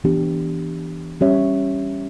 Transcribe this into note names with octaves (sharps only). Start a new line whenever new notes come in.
E3 B3 D4 G4
G3 C#4 G4 C#5 E5